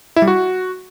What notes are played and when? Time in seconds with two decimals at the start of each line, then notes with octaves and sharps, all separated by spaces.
0.16 E4
0.22 G3
0.28 F#4